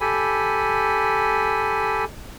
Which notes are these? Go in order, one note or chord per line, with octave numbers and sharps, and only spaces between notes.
G4 A4 G#5 B5